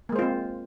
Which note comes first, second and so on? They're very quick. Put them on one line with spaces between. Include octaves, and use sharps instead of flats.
A#3 G#3 C5 F4 C4